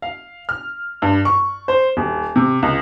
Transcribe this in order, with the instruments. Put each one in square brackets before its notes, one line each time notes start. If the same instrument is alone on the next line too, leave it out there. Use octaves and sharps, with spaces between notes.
[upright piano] F5
F6
G2
C#6
C5
D#1
C3
C#2